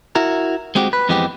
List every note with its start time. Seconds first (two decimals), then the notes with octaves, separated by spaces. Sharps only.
0.15 E4 F#4 A#4
0.75 G#3 C4 F#4 G4
0.93 B4
1.09 F2 E3 G#3 B3 C4 G4